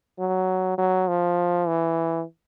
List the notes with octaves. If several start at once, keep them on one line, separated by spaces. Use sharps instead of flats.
F#3
F#3
F3
E3